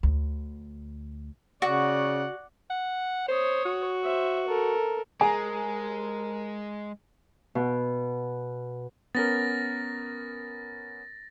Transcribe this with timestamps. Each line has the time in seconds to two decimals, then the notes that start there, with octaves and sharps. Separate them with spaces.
0.03 D2
1.62 C#3 F#4 D5 F#5
2.70 F#5
3.28 C5 C#5 D#6
3.65 F#4
4.04 C5 E5
4.47 A4 A#4
5.21 G#3 G#4 A#4 G#5 A#5
7.55 B2
9.15 B3 C#4 A#4 A6 A#6